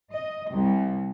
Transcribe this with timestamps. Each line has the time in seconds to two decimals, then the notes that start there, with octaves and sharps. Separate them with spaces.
0.12 D#5
0.52 C2